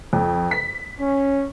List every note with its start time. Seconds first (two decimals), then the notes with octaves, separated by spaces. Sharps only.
0.13 F2
0.51 B6
1.00 C#4